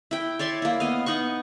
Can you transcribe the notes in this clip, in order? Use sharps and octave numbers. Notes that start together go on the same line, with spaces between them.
E4 G5
C#5 D5 E5 C6
A#3 E4
B3 D#5 F5
B3 D#4 F#5 C#6